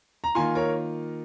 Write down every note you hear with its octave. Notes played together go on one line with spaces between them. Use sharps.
A#5
D#3 A#3 F4 G#5 C6
A#4 C#5